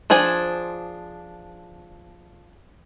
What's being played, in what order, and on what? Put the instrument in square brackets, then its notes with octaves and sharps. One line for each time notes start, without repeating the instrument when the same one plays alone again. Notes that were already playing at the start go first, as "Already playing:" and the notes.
[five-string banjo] F3 D4 G#4 C5 G#5